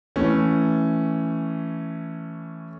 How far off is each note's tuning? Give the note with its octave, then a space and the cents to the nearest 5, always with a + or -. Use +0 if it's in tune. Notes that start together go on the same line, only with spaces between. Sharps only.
E3 +0 A3 +0 C#4 +0